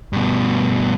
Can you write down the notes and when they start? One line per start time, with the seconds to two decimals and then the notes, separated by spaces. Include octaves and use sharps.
0.13 G2 B2